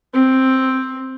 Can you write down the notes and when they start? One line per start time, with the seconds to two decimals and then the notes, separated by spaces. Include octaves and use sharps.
0.14 C4